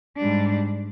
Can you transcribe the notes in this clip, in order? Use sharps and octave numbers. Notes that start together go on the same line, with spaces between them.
G#2 G3 D4